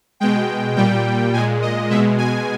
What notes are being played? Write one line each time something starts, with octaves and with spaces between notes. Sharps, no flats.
B2 G#3 G5
A#2 G3 G5
A#2 G#3 G#5
D#5
B2 G#3 E5
G#5